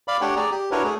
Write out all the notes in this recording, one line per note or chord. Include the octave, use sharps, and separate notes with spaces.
D5 F5 B5
A3 D4 G4 C#5 F#5 G5
G#4 D5 A#5
G4
D4 E4 F#4 A#4 B4 C#5
A3 G#4